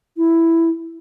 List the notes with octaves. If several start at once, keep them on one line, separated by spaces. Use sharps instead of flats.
E4